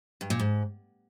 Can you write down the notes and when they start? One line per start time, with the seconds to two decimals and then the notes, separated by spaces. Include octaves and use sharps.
0.21 G2
0.30 A#2
0.39 G#2